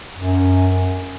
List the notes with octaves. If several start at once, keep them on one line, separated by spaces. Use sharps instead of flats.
F#2